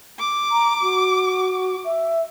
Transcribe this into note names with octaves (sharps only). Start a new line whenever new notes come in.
D6
A#5
F#4
E5